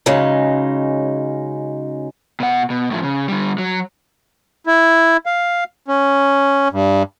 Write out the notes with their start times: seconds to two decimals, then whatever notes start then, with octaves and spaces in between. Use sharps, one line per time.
0.06 C#3 F#3 G#3 D#4
2.40 B2 F#5
2.70 B2
2.91 A2 F3
3.03 C#3
3.28 D3 G3
3.58 F#3
4.67 E4
5.26 F5
5.88 C#4
6.72 G2